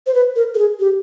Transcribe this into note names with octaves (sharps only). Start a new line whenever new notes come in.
C5
B4
A#4
A4
G#4
G4